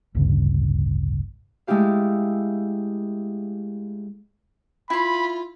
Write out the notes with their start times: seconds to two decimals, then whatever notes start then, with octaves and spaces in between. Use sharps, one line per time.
0.15 A1 D2 G2 C#3
1.67 G#3 A3 E4 G4 F5
4.90 E4 F4 B5 C6